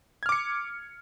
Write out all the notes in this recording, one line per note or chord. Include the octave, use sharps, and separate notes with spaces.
D6 F6 G#6 C#7